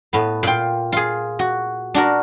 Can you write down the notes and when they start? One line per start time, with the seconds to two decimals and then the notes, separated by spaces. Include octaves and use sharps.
0.13 A2 B3
0.43 A#2 F4 G5
0.92 F4 G#4
1.39 F#4
1.94 D4 F#4 A#4